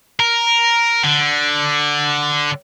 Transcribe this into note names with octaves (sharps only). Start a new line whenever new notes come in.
A#4
D3